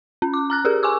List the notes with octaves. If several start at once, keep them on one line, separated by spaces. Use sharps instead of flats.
C#4
D6
A#5 F6 F#6
G4 G#4 A#4
G#5 C#6 D6 E6